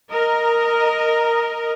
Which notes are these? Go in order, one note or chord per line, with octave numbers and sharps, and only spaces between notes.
A#4 D#5